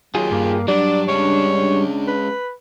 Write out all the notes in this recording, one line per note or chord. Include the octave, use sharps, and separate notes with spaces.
D#3 F#3 F4 G4 G#4
G2 A#3
G2 F#3 G3 D4 D5
G#3 C#4 C#5
B4